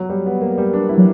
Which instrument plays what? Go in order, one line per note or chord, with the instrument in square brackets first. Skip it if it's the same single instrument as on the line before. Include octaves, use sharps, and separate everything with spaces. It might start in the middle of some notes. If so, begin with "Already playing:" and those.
Already playing: [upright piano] F#3
G3
B3
A#3
G3
D4
E4
[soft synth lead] F#3